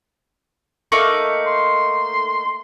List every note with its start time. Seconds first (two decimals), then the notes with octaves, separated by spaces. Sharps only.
0.92 A3 A#3 D#4
1.47 C6